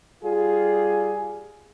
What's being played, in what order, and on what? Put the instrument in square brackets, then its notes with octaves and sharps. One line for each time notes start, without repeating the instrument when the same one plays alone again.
[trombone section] G3 F4 G#4